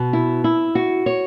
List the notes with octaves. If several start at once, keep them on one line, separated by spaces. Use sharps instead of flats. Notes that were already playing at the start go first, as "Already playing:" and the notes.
Already playing: B2
E4
E4
F#4
C#5